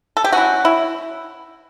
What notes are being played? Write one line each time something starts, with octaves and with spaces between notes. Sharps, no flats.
A4
G4
F#3 C#4 E4 F#4
E4